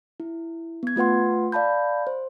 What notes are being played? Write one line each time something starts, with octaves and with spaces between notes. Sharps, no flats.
E4
B3 G#6
A3 F4 B4 F#5 C6
D5 F5 A5 B5 G6
C5